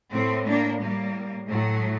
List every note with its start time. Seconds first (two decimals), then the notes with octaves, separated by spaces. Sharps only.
0.11 A2 A3 C4
0.46 A#3 D4
0.81 A2 G3 A#3
1.50 A2 F#3 A3